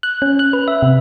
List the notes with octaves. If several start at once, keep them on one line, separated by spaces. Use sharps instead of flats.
F#6
C#4
F#6
B4
E5
C3